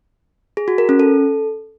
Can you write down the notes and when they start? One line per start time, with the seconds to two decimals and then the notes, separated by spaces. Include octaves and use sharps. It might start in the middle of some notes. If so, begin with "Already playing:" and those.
0.57 G#4
0.68 F#4
0.78 A#4
0.89 C#4
1.00 A4